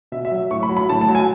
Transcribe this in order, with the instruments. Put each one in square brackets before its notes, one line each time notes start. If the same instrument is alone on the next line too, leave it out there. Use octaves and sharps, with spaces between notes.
[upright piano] B2 E5
E5
F#3
A2 C#6
B5
F#3
B5
A2 A5
A5
F#3
G#5